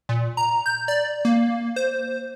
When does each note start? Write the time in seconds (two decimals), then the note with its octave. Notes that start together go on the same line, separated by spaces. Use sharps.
0.09 A#2
0.37 A#5
0.66 G6
0.88 D5
1.25 A#3
1.76 C5